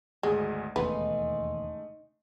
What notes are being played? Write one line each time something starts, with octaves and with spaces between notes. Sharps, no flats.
G#1 D2 G#3 D#6
E1 D#2 G#2 C#3 A3 D#4 B4 C6